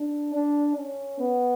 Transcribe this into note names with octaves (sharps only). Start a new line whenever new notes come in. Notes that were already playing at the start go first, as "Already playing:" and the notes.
Already playing: D4
D4
C#4
B3